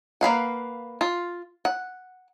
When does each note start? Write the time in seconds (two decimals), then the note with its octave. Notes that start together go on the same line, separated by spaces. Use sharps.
0.21 A#3 B4 F5 F#5
1.01 F4
1.65 F#5